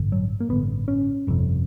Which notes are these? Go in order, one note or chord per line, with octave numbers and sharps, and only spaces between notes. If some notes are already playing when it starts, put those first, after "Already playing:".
Already playing: A1 G2 D3
F#3
A#3
A1 G2 D3 B3
C#4
G1 F2 C3